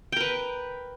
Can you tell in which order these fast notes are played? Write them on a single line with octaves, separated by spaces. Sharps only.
G5 A#4 B4